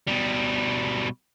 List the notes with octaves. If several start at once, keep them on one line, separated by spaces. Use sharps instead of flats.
B2 G3